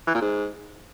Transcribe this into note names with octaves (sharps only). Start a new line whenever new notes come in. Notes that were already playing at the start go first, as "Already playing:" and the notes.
E3
A#2
G#2